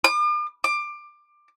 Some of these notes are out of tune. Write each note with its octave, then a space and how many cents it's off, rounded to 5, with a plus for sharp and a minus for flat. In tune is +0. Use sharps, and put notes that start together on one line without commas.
D6 +45
D6 +20